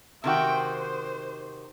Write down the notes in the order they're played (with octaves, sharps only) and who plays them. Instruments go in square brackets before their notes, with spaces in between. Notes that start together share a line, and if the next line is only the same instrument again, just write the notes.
[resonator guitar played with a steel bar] C3 D#3 F#4 [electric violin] E5 G5
[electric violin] C5